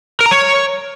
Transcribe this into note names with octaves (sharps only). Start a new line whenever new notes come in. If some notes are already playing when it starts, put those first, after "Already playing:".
A#4
A#5
C#5